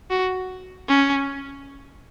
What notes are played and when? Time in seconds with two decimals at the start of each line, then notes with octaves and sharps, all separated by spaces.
0.10 F#4
0.88 C#4